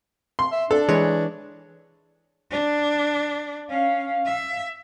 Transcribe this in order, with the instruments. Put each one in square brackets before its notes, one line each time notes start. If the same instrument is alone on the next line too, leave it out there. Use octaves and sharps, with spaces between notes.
[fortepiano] C6
[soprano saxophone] E5
[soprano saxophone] D4 [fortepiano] A4
[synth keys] E3 C#5 [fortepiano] G#3
[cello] D4
[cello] C#4 [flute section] F5
[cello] E5